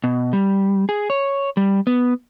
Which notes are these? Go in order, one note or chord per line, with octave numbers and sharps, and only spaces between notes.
B2
G3
G#4
C#5
G3
B3